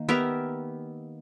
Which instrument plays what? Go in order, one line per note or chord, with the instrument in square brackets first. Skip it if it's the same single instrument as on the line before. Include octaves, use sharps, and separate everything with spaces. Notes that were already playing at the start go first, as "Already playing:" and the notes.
Already playing: [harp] D#3 A#3
[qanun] B3 G4 A#4 E5